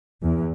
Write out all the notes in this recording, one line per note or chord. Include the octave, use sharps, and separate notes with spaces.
E2